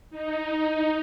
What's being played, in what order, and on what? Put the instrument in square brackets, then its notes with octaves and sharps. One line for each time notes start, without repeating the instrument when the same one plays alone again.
[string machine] D#4